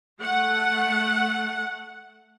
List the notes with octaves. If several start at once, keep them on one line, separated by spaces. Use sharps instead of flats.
A3 F#5